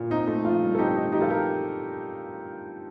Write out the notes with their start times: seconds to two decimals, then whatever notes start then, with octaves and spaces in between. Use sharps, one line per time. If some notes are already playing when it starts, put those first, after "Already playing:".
Already playing: A#2
0.10 C4 D#4
0.27 A3
0.45 F3 F4
0.61 G2
0.75 A4
0.78 C4 D#4 G4
0.96 A3 D#4
1.12 F3 D#4 G4
1.21 F4 A4
1.30 G4 A#4